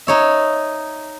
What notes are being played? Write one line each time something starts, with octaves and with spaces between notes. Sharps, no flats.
D#4 C#5 E5